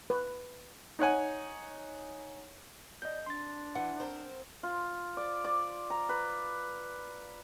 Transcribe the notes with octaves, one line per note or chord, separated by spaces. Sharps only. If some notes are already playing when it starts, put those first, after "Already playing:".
B4
D#4 C#5 F#5 G#5
F2 D5 D#5 G6
D4 C6 A6
E3 F#5
C4 A#4 C5
F4
D5
D5
A#5
B4